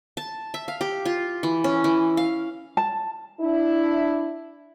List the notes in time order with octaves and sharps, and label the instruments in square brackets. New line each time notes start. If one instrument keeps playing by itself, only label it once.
[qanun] A5
E5
F5
G4
F4
E3
C#4
E3
F5
[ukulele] A5
[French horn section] D4 E4